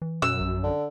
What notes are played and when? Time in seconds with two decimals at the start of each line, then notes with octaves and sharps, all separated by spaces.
0.02 E3
0.22 F#2 B2 E6
0.40 A#1
0.63 D3